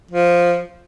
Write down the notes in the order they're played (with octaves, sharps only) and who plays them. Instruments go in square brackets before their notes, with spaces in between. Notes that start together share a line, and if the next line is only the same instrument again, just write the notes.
[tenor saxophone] F3